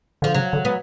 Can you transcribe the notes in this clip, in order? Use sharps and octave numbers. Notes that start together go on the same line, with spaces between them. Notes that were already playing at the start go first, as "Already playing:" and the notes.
D3 F3
C#3 F#3
D3
B3